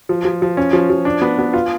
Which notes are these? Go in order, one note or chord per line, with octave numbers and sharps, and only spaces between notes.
F3
F3
F3
C#4
F3
F3
D4
B3
B3
F4